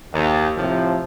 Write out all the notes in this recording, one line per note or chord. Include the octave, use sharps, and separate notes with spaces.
D#2
A2 C3 F3